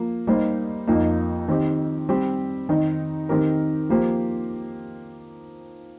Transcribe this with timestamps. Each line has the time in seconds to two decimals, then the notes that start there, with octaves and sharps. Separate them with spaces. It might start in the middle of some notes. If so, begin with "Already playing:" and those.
Already playing: F3 A#3
0.27 G3 A#3 D#4 C5
0.87 F2 F3 A#3 D#4
1.48 D#3 C4 G4
2.09 G3 C4 G4
2.69 D#3 C4 D#4
3.29 D#3 C4 G4 A#4
3.89 F3 A#3 G4 C5